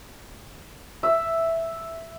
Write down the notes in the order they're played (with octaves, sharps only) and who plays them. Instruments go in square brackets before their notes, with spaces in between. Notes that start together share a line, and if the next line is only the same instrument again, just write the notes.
[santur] E5